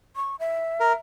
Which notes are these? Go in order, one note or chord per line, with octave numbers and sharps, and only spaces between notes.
C#6
E5
A#4